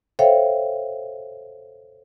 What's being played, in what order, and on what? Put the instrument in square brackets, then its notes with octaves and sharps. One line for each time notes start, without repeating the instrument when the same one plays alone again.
[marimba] A4 C5 C#5 E5 F5 G5